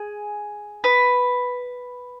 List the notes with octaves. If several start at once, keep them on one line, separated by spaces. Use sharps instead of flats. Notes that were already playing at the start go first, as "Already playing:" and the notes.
Already playing: G#4
B4